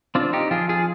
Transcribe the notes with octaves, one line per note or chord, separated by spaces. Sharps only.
C4 D4 F4
D#4 G4
F3 F4 G#4
F4 G#4